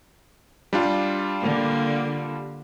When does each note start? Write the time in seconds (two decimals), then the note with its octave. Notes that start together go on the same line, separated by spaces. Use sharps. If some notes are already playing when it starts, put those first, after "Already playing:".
0.73 G3 D4 F4
1.41 D3 A#3